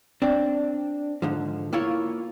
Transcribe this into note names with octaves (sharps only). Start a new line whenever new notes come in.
C4 D4
G#2 D3 F3
A#3 E4 F4 C#5